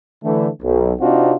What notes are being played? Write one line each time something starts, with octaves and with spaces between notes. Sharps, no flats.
D3 E3 A3
B1
C3 C4 D4 D#4 F4 F#4